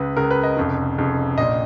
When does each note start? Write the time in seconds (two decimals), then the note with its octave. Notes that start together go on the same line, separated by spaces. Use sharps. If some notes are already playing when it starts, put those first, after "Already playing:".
Already playing: C#2 C#3 B4
0.17 C#2 C#3 A#4
0.31 B4
0.43 D#5
0.57 F1 F2 C#3
0.98 F1 F2 C#3
1.38 A#1 A#2 D#5